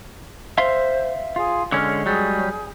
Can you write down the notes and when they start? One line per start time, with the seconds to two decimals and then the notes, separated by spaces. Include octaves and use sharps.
0.58 C5 E5 F5 C6
1.36 F4 G#4
1.72 D3 G#3 C#4 A#4 C#5
2.06 F#3 G3 G#4